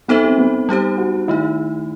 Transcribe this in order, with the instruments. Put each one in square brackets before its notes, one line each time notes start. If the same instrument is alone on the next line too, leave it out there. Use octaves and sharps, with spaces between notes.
[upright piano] B3 [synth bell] D#4 A4 C5 E5
[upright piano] C4
B3
[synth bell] G3 D#4 G4 C5
[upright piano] F#4
[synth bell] D#3 A3 D#4 [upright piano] E4